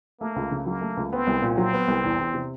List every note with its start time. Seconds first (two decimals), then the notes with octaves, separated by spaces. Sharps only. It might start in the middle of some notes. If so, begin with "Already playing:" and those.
0.20 A3 A#3
0.36 C#2
0.51 C#3
0.66 F#3 A#3
0.81 A3
0.97 C#2
1.12 B3 C4
1.27 C2
1.42 A#2
1.57 F#3 C4
1.73 B3
1.88 C2
2.04 E2
2.20 E2
2.34 C3